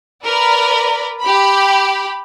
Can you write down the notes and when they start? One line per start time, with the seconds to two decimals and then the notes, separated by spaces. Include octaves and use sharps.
0.22 A#4 B4 D5 B5
1.20 G4 B5